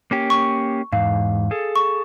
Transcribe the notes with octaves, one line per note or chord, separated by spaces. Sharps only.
A#3 C#4 G4
C#6
E2 G#2 F5
G#4 A4
C#6